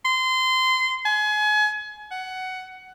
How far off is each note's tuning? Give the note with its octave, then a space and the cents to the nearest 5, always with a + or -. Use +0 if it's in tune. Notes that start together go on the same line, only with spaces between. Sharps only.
C6 -20
G#5 +30
F#5 +15